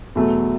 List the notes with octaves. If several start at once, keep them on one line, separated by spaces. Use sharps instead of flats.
E2 B2 F#3 A3